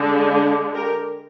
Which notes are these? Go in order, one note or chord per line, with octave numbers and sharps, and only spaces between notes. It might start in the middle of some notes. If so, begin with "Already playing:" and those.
Already playing: D3 G#3 D4
D4
G4 A#4